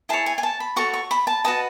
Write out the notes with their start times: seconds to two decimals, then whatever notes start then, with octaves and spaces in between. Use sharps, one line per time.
0.09 E4 G#4 C#5 A5
0.26 G#5
0.38 G#5
0.43 A5
0.60 B5
0.76 F#4 A4 C#5 C#6
0.94 C#6
1.11 B5
1.27 A5
1.44 F#4 B4 D#5 A5